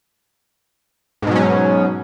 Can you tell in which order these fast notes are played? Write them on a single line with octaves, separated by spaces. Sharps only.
G#2 B2 F#3 C#4